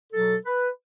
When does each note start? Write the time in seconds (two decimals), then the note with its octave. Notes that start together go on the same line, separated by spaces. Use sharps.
0.13 B2 F#3 A4
0.45 B4